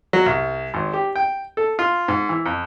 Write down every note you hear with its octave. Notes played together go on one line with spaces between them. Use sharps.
F#3
C2
G#1
G4
G5
A4
F4
G#2
E3
F2